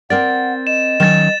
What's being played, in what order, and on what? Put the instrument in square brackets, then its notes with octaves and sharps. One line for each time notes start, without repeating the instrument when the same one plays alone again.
[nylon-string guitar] C4 A#4 D5 [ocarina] F#5 [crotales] A6
[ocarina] D#5 [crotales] E7
[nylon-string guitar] D#3 F#3 C#4 [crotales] A6 E7